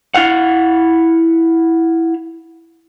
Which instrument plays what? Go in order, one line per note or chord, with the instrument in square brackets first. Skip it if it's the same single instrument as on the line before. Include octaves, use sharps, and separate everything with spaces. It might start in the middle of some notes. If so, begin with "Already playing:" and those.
[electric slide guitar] E4 F5 F#5